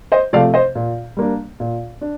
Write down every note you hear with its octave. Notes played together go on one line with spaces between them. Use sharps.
C5 D#5
C3 F3 A3 D5 F5
C5 D#5
A#2
G3 A#3 D4
A#2
D4